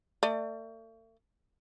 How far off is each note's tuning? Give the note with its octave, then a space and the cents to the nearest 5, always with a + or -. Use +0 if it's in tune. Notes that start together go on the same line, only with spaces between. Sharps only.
A3 +40 D5 +30